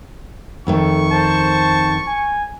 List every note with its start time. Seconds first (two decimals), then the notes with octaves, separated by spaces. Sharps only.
0.67 F2 D#3 A3 C#6
1.12 C5 A5
2.07 G#5